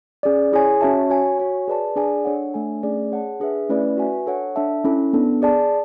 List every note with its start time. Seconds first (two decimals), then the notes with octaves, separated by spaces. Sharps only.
0.23 C#4 G#4 D5
0.52 E4 G#4 C#5 G#5
0.81 C#4 F#4 C#5 E5 A5
1.10 F#4 C#5 G#5
1.38 F#4 C#5 G#5
1.68 G#4 B4 D5 A5
1.96 D4 G#4 D5 G#5
2.25 D4 A4 C#5 F#5
2.54 A3 D4 A4 C#5 G#5
2.83 A3 C#4 G#4 D5
3.12 G#4 C#5 F#5 A5
3.40 D4 G#4 B4 E5
3.69 A3 C#4 E4 B4 D5
3.98 F#4 B4 E5 G#5
4.27 D4 A4 C#5 F#5
4.56 D4 A4 E5 A5
4.85 C#4 E4 A4
5.13 B3 D4 A4
5.42 G#4 D5 A5